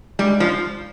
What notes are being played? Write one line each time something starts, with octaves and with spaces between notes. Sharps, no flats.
G3 G#3
F3